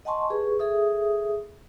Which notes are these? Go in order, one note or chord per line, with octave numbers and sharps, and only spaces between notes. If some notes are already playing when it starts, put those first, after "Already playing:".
D#5 F#5 G#5 A5 C6 C#6
G4 G#4 B4 C#6
G#4 A4 E5 D#6